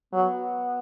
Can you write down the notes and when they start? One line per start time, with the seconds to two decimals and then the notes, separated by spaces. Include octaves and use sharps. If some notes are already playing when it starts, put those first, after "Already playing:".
0.13 F#3 B3